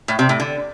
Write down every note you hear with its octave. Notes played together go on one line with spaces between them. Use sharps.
A2
C3
A2
D3